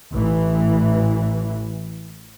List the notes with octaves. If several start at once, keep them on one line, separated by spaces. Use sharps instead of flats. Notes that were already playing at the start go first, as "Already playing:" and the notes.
A1 E3